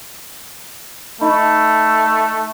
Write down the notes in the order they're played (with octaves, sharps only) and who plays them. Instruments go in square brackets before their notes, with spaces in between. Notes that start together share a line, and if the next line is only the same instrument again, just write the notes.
[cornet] A3 [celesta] D#4 D#5 B5